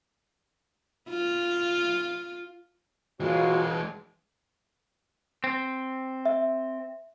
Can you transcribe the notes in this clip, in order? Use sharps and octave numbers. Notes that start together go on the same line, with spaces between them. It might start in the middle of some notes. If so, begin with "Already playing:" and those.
F4
E3 G#3 F4 F#4 C#5
C4
E5